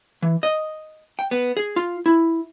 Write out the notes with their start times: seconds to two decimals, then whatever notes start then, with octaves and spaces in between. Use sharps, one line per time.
0.23 E3
0.43 D#5
1.19 G5
1.31 B3
1.57 G#4
1.76 F4
2.06 E4